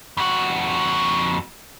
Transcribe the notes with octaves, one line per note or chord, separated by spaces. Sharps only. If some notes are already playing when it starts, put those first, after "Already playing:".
F2 F#4